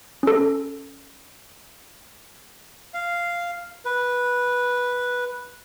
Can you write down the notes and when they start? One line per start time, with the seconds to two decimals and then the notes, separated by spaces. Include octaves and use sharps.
0.23 C#4 A4
2.94 F5
3.85 B4